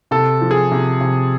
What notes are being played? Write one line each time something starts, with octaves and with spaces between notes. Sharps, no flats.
C3 A4
F3
G#4
C3
C3